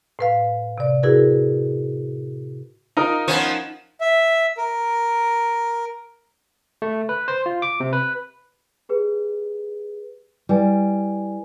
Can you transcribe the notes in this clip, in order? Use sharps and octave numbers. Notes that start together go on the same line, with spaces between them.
A2 B4 F5
C3 D5
E4 F#4 G#4 A#4 B4
D#4 F4 A#4 D#5
F3 B3 C#4
E5
A#4
A3
B4
C5
F4
D6
C3
B4
G4 G#4 B4
G3 E4 B4 G#5